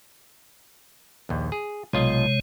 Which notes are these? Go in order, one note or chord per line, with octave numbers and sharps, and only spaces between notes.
A#1 D#2
G#4
B1 C3 G#3 F4 C#5 D#5